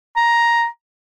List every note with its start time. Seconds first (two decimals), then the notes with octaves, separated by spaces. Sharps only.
0.16 A#5